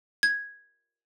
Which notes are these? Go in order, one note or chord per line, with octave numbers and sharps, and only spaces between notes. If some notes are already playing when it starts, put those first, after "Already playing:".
G#6